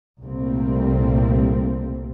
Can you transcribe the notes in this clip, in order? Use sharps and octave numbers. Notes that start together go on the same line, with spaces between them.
C2 A#2 G3 A3 A#3 C4